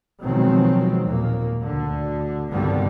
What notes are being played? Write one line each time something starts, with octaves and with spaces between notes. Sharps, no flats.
B2 D#3 F3 F#3 G#3 C4
D#2 A#2 A#3
D2 D3
C2 G2 D3 D#3 G3 B3